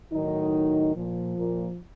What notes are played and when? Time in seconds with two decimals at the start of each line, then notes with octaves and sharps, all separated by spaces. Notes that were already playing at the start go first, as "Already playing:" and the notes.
0.13 A2 D#3 F#3 D#4
0.96 A#2 F3
1.37 A#2 A#3